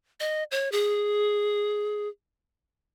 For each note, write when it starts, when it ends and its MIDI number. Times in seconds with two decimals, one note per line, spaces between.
0.20 0.44 75
0.51 0.71 73
0.72 2.08 68